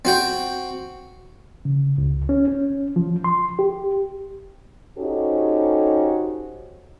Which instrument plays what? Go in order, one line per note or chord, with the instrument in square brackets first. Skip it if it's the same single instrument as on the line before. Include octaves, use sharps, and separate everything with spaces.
[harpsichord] C4 F#4 G5
[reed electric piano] C#3
C#2
C#4
C#4
F3
C6
G4
[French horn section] C#4 D#4 F#4 G4 A4 C5